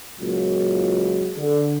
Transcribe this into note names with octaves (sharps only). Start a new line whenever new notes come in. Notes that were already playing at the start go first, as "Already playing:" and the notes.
C#2 A#2 F#3
D3